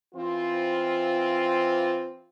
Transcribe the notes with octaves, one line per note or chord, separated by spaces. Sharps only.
E3 C4 F4